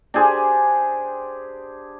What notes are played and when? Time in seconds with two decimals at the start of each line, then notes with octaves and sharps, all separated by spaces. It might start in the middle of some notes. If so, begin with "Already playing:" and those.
0.14 D4 G4 G#4 C5